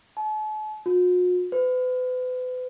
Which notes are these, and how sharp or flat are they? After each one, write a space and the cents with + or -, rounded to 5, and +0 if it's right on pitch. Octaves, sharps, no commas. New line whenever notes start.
A5 -45
F#4 -45
B4 +40